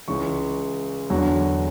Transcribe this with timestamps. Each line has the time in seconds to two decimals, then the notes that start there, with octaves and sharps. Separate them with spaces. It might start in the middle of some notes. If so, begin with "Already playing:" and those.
0.08 C#2 C#3 E3 C#6
1.10 E2 D3 F#3